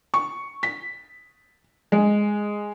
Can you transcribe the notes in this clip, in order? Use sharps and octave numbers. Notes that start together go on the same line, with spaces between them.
C#6
B6
G#3